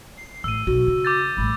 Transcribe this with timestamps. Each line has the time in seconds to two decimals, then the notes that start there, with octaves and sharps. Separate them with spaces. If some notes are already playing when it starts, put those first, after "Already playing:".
0.17 C7
0.44 A1 E6 D#7
0.67 B1 F#4
0.88 C#3
1.05 D6 G6 A6
1.37 A1 G3 B5